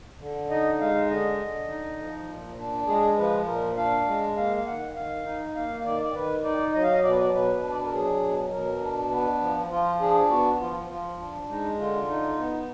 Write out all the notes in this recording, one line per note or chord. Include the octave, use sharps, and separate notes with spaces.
D3
D#4 D#5
G#3 F5
D3 D#5
D3
D#4
F3
A#2
D4
G#3 G#4
F3 B4
A#2 A#4
D4 F5
G#3
A#3 F5
F5
D#3 F#5
D#3 F5
D#4
A#3 F5
D#3 D5
D5
D#3 B4
D#4 D5
F#3 D#5
F5
D#5
B2 D5
B4
D5
B2 B4
D4
D5
B4
A#4
F#3 G#4
B2
B2 A#4
D4
B3 B4
F3
F3 F4
D4 G#4
B3 F#4
F3 F4
F3 F4
D4
G#3 D#4
D3 F4
D#4
B3